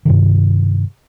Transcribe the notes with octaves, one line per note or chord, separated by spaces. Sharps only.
G2 C3 D#3